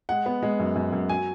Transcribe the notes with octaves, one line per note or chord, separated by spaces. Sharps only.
G#3 F#5
B3
G#3
F#2
F#2
F#2
F#3 G#5